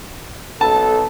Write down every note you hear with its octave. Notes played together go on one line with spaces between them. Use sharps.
B1 A4 A5